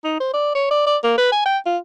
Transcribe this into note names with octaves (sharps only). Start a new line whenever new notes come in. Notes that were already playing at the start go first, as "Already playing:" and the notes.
D#4
C5
D5
C#5
D5
D5
A#3
B4
G#5
G5
F4